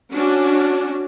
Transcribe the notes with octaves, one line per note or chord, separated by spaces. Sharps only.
C#4 D4 F#4